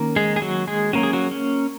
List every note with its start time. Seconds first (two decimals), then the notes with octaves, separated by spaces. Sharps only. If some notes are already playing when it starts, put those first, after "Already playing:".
Already playing: D#3 A#3 C#4
0.16 G#3 G#4
0.36 G#4
0.42 F#3 F#4
0.67 G#3 G#4
0.93 F#3 A#3 C#4 F#4
1.03 G#4
1.13 F#3 F#4
1.31 C#4